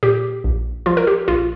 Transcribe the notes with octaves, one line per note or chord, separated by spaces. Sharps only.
A#2 G4
A#1
F3 F4
A#4
G4
A#1 F4